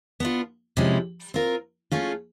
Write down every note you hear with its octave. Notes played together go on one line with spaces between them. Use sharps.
B3 D4 F4
C3 F3 G#3 C#4 E4
C4 F4 A#4
A3 C#4 F4 G#4